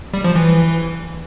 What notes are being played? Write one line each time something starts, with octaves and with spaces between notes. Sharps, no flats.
G3
F3
E3